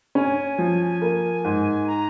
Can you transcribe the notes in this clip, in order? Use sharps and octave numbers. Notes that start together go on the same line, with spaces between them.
C#4 G#5
F3
A#3
G#2
A#5